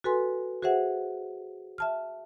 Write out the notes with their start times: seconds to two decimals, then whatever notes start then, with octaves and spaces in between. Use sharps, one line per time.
0.04 F#4 A4 B4 G#5 C6
0.62 F#4 G#4 C5 E5 F#5
1.78 E5 A5 F6